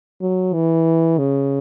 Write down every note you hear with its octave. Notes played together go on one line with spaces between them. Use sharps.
F#3
E3
C#3